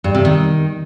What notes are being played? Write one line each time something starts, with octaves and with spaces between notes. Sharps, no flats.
G2
C3
D#3